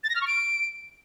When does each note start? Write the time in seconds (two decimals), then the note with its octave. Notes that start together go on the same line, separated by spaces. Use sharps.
0.04 A6
0.10 A#6
0.15 F6
0.21 C#6
0.27 D7